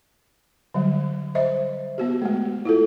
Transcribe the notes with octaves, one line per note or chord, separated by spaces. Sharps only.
D3 F#3 G3
C5 D#5 E5
B3 F#4 G4
G#3 A3
E4 F4 A4